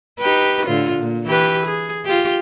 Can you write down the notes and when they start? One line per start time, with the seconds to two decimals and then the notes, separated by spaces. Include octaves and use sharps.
0.19 D#4 G4 B4
0.65 A2 D3 F4
0.97 A#2
1.26 E3 G4 B4
1.66 G#4
2.06 F4 G4